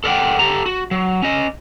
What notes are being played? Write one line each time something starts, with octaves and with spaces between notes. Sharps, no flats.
A4 A#4 D5 D#5 F#5 G5
G4 A4 A#5
F#4
F#3
C#4 D#5